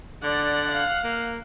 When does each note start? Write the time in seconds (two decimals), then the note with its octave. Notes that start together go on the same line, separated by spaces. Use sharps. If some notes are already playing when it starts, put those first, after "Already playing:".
0.23 D3 D5 F#5
0.72 F5
1.04 A#3